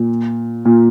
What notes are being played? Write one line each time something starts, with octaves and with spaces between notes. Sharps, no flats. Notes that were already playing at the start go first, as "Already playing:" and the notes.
Already playing: A#2
A#2